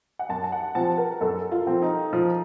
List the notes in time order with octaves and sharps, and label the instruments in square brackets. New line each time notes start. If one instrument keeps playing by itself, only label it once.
[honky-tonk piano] F#5
[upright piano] F#2 [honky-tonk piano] A5
[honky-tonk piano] A5
F#5
[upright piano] F3 C4 [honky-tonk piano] A5
[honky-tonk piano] A#4
[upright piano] F#2 [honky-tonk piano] A4
[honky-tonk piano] F4
[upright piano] F3 C4
[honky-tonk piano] D#4
[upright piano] F3